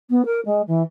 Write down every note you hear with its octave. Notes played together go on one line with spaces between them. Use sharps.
B3
A#4
G#3
E3